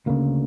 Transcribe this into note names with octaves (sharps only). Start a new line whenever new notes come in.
D2 C#3 A#3